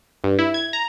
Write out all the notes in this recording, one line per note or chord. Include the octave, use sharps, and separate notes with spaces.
G2
E4
G#6
A#5